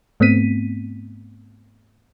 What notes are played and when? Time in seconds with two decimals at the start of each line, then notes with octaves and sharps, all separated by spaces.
0.20 G#2 A3 B3 C4 B6 D#7